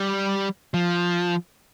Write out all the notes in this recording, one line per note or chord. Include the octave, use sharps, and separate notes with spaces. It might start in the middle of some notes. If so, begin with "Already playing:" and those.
Already playing: G3
F3